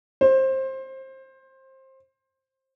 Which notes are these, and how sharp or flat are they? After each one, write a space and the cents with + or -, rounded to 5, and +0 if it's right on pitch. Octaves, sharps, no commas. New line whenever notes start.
C5 +20